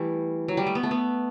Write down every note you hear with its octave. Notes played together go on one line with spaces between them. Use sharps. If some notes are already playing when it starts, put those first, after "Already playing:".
Already playing: E3 G3 A3 G4
F#3
G3
A3
B3
A3
B3